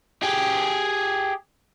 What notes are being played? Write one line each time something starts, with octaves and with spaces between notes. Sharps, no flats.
G4 G#4